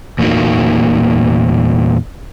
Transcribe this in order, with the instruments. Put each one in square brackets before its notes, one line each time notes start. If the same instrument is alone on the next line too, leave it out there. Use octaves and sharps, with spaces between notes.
[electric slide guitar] E2 A#2 A3 A#3 D#4 F#4